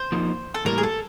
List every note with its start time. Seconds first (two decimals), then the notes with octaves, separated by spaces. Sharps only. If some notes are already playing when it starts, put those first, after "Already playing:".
Already playing: C5
0.12 F3 A#3 D#4
0.54 A4
0.65 A2 E3 G3 A#3 A#4
0.78 G#4
0.83 A4